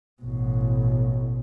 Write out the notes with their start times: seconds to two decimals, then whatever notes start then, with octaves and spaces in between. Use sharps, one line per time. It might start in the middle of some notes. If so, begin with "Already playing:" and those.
0.23 A1 B2